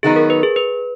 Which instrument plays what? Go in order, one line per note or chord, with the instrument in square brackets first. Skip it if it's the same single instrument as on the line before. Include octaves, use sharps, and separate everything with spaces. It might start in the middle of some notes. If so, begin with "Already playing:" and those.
[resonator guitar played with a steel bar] D#3 F#3 B3 D#4 [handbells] G#4
[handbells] A#4
B4
G#4
B4